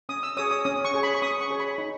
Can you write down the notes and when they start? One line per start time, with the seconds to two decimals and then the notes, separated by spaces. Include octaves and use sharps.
0.09 C#4 D#6
0.23 E6
0.37 G#4 C#5 D#6
0.51 D#6
0.65 C#4 D#6
0.85 C#6
0.94 G#4 C#5
1.03 B5
1.15 C#6
1.22 C#4 D#6
1.41 C#6
1.50 G#4 C#5
1.60 B5
1.78 D#4